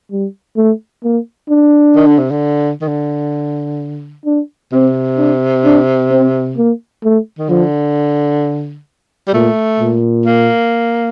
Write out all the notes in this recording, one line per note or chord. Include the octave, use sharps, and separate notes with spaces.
G3
A3
A#3
D4
D#3
D3
C3
D3
D#3
D3
D4
C3 C4
D4
D4
C4
A#3
A3
D#3
D3 F3
G3
A#2 A3
A#2
A#3